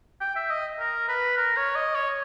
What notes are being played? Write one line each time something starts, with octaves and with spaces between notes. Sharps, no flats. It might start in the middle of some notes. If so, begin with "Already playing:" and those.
G5
E5
D#5
A#4
B4
A#4
C#5
D#5
C#5